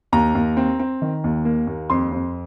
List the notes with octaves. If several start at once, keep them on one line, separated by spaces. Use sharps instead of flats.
D#2 A#5
D#2
C4
C4
D#3
D#2
A#3
D#2
F2 C6
F2